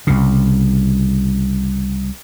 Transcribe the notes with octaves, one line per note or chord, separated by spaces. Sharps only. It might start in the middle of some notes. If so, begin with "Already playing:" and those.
C2 C#3